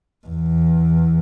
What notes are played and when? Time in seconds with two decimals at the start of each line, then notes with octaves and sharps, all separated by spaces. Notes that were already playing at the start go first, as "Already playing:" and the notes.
0.26 E2